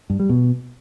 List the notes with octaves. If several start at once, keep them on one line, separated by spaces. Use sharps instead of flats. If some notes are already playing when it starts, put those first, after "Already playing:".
G2
G3
B2